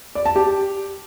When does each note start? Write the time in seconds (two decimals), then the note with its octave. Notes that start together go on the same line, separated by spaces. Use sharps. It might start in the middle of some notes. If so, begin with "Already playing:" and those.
0.15 D5
0.26 A5
0.36 G4